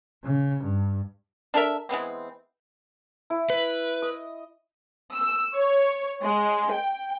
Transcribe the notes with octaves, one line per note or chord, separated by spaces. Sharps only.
C#3
G2
D4 A4 A#4 E5
E3 G#3 B3 C4
E4
B4
D#5
E6
C#5
G#3
G5